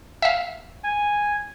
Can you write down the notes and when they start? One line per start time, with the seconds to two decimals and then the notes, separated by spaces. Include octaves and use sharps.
0.22 E5 F5
0.84 G#5